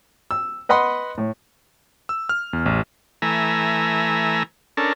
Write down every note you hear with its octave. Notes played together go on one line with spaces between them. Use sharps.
E6
B4 D#5 F#5 B5 C6
A2
E6
F6
E2
A1
E3 A3 G#5 A#5 E6
C#4 D4 A4 A#4